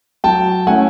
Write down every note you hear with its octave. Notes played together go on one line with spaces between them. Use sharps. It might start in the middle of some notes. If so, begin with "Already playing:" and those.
F#3 G5 A5
A3 C#4 E4 F#5 G#5